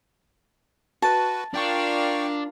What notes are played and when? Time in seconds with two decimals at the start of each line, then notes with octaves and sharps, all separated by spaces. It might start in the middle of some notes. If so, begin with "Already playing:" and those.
1.02 F#4 B4 A5
1.54 D4 F4 A#4 D5 F5 G5 C#6